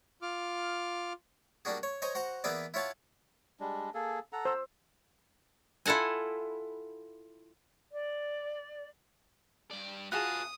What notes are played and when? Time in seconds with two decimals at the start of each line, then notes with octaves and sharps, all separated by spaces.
0.22 F4 D6 F6
1.65 G3 A#3 D4 F#4 G#4
1.83 C#5
2.02 C5 C#5 D#5 G#5 A#5
2.15 F#4 C5 F#5 A#5
2.44 E3 A#3 B3 E4 G#4 D5
2.74 E4 F4 C#5 F#5 A5
3.60 G3 G#3 D4
3.94 A#3 G#4 A4
4.33 A4 F#5 A#5
4.45 C5 E6
5.86 E4 F4 A4 F#5 G#5
7.92 D5
9.71 G2 D5
10.12 B3 F4 F#4 G#4 A5 D#6 F#6